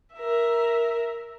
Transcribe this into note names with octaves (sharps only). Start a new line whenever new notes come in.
A#4 E5